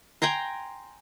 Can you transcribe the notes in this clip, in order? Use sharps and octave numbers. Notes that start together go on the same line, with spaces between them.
G5 G#5 A#5 C6